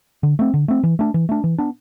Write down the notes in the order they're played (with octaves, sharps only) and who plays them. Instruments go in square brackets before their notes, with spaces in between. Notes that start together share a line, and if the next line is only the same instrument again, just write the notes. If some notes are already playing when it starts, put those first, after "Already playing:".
[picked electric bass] D3
A3 C4
D3
A3 C4
E3
A3 D4
E3
A3 D4
E3
B3 D4